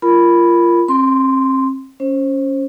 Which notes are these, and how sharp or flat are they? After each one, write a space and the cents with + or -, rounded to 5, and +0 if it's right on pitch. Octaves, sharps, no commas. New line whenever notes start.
F4 -20 A#4 +0 B5 +0
C4 +35 C6 -5
C#4 +0 C5 +25